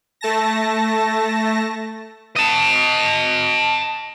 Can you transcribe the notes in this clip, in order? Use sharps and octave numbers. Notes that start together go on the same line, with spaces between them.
A3 A5 A#6
D#5 A5